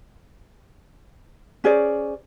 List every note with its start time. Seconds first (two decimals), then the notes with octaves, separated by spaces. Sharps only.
1.64 C#4 G#4 C5 D5